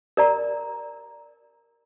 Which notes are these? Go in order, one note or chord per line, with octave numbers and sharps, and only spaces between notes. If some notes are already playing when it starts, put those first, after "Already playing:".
A#4 D5 A#5